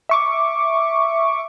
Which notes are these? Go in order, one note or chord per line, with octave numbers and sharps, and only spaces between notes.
E5 C#6 D6